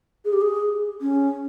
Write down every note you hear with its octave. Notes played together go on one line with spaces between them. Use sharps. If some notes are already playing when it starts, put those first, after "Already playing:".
G#4
G4
G#4
C#4